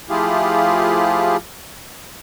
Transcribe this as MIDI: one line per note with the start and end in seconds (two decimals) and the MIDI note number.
0.09 1.37 53
0.09 1.37 57
0.09 1.37 64
0.09 1.37 65
0.09 1.37 67
0.09 1.37 68